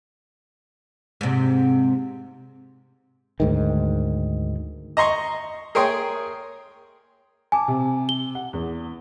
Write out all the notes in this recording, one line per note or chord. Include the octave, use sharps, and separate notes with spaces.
G#2 C3
D2 G#2 D#3
D#5 A#5 C6 C#6
G#4 A#4 C#5 G5 C6 D#6
G#5 A5 D6
C3
G7
F#5
E2